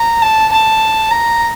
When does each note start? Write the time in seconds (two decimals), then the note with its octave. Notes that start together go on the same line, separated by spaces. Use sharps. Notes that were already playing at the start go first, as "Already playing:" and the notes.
Already playing: A#5
0.22 A5
0.52 A5
1.11 A#5